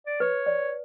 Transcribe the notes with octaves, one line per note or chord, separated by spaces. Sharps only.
D5
B4 C#5
D5